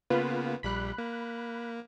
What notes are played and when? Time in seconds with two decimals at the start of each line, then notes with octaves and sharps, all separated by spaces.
0.10 C#3 A#3 B3 F4 B4
0.63 A#1 G3 B5 F#6
0.98 A#3